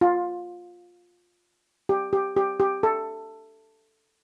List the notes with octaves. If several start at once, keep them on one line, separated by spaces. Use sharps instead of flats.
F4
G4
G4
G4
G4
A4